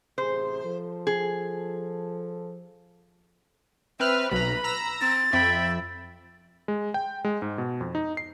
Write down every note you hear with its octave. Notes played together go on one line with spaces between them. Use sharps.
A1 C3 G#4 C5
F3 A4
G#4
C4 B4 E5 F6
B1 B4 A#5 B5
A#5 E6 A#6
C4 A6
F2 E5 G5 B5
G#3
G5
G#3
G#2
B2
F2
D#4
C7